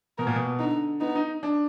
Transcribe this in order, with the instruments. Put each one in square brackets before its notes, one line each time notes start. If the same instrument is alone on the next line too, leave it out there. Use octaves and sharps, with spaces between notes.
[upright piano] B2 [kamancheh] A#4
[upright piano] A#2
B2
[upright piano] D3 [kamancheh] D#4
[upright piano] B3 [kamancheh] D#4
[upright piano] D#4
D4